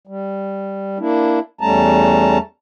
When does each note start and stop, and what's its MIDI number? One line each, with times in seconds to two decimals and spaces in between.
0.07 0.98 55
0.99 1.39 58
0.99 1.39 62
0.99 1.39 64
1.61 2.38 40
1.61 2.38 55
1.61 2.38 57
1.61 2.38 61
1.61 2.38 81
1.61 2.38 82